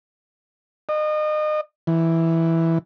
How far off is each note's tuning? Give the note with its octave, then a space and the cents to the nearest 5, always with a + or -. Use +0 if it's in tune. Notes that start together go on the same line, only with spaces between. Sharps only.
D#5 -30
E3 -5